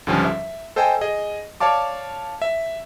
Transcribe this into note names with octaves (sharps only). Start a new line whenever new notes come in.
C#2 G#2 D3 F3 G3 C#4
E5
A4 C5 D#5 G5 G#5
G#4 D#5
C#5 D5 F5 A5 D6
E5